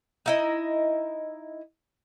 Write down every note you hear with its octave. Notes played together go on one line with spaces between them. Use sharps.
D#4 E4 D#5